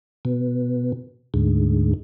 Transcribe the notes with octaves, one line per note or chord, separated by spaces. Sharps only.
B2
D2 G#2